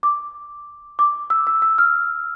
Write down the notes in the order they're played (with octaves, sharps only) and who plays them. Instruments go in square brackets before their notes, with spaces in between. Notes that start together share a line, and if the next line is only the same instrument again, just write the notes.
[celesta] D6
D6
E6
E6
E6
F6